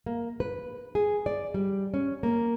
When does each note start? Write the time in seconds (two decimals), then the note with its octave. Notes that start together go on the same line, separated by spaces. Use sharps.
0.06 A#3
0.40 B4
0.95 G#4
1.26 D5
1.54 G3
1.94 C#4
2.23 A#3